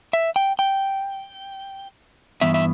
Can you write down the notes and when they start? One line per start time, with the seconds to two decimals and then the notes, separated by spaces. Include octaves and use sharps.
0.13 E5
0.36 G5
0.59 G5
2.41 G2 E3 B3 E5
2.54 E5